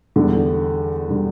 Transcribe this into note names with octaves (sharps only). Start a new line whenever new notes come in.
E2 D3 G3
D3 G3